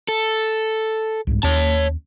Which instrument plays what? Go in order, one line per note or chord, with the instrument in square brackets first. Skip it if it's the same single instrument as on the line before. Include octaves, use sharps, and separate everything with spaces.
[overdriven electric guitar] A4
[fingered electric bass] C2 G#2
[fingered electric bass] D#2 C#4 [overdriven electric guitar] C#5 A5